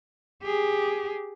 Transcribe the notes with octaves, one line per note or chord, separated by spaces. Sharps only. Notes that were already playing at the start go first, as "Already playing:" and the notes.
G4 G#4